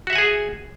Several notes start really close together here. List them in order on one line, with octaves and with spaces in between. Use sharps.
F#4 E5 F#5 G#5 G#4